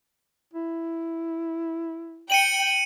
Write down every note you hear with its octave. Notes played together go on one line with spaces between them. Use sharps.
E4
G5 C#7 D#7 F#7